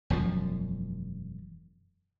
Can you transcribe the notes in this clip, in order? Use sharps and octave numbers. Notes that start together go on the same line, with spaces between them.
E1 F#2 F3